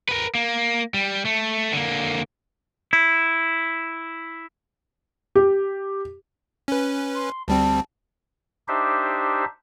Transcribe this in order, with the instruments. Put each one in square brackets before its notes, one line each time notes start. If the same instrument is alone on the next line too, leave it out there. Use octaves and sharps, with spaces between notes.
[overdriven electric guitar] A#4 B4
A#3
G3
A3
D3 A#3
[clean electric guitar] E4
[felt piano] G4
[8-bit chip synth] C#4 B4
[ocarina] C6
[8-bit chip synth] D2 G3 C4 [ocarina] A5
[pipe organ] D4 D#4 G4 C5 E5